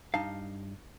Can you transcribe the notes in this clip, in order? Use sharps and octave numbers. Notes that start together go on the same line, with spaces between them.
G2 D#4 F5 A5